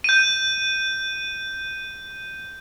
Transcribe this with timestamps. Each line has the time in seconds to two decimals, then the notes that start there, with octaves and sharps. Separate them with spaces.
0.04 G6 D#7